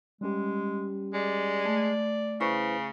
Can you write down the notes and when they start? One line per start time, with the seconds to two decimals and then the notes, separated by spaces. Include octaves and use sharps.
0.21 G3 G#3 C#4 G4
1.14 G#3 D5
1.65 A3
2.41 C#3 E4 B4 C5 C#6